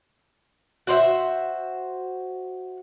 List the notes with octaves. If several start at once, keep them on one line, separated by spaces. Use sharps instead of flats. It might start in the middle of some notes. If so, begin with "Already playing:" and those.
F#4 C5 D#5 E5